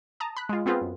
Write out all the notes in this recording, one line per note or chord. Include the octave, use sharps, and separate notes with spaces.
A5 A#5 D#6
B5 F#6
G#3 F4
B3 C4 F4 G#4 B4
F#2